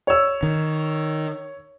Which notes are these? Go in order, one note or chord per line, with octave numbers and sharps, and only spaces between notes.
C#5 E6
D#3